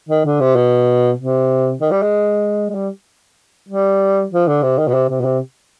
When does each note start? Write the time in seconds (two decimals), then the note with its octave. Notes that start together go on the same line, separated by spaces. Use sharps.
0.09 D#3
0.25 D3
0.40 C3
0.56 B2
1.18 C3
1.81 D#3
1.91 G3
2.02 G#3
2.70 G#3
2.75 G3
3.69 G3
4.31 F3
4.48 D3
4.63 C3
4.78 D#3
4.88 B2
4.94 C3
5.09 C3
5.21 B2
5.25 C3